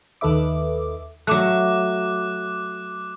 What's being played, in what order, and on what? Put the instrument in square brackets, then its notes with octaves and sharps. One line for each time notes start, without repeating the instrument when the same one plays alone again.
[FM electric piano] D#2 D#3 A4 B4 E5 D6
[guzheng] F#3 A3 [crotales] D6 F#6